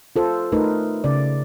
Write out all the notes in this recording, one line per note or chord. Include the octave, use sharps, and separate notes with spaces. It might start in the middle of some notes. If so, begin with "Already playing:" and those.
F4 A4 C5
A3 D#4 A#4 B4
C#3 D5